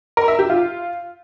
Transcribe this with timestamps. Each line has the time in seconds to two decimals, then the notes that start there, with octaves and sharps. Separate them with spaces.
0.17 A#4
0.28 E5
0.39 G4
0.50 F4